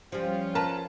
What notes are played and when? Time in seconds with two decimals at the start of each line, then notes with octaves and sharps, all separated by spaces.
0.12 F3 G3 C#4 F4
0.55 A#4 B4 A5